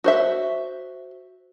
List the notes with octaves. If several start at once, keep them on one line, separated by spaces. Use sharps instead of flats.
F#4 C5 E5